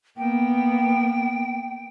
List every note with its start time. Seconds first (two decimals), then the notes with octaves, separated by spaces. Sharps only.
0.17 A#3 B3 G5